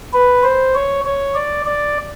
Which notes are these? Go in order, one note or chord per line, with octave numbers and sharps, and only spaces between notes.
B4
C5
C#5
C#5
D5
D5